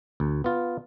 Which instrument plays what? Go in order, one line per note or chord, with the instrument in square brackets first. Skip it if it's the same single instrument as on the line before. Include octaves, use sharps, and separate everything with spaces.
[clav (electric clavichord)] D2
B3 F4